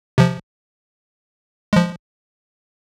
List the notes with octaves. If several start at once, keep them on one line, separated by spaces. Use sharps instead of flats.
C3 F3
F3 G#3